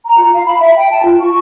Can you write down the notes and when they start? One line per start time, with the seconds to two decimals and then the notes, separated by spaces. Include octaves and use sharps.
0.05 A#5
0.19 F4
0.34 F5
0.46 B5
0.60 E5
0.76 G5
0.91 A5
1.05 F4
1.20 C#6